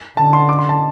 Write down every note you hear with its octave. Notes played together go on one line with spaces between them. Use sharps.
D3 A5
C6
D6
C6
A5